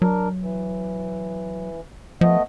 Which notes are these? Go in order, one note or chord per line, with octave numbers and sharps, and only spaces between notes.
F#3 D4 A#4
E3
F3 A3 B3 D#5